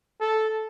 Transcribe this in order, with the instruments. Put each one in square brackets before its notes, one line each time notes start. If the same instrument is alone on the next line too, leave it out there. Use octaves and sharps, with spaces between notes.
[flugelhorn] A4